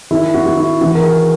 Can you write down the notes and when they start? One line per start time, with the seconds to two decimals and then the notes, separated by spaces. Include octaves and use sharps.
0.11 D#3 E4
0.34 F#4
0.45 D#3 F#4
0.57 E4
0.81 E3 F#4
0.95 A#4
1.04 G#4